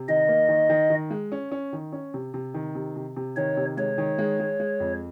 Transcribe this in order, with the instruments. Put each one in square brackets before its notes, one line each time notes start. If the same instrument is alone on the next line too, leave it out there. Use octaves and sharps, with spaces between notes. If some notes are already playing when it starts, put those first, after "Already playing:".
Already playing: [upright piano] C3
[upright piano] D#3 [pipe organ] D#5
[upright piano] A#3
D#3
D#3
D#3
G#3
C#4
C#4
D#3
C#4
C3
C3
D#3
C3
C3
C3
[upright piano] D#3 [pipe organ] C#5
[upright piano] C3
[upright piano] G#3 [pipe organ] C#5
[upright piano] D#3
G#3
G#3
G#3
F2